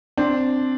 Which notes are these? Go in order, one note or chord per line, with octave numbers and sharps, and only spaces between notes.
C4 D4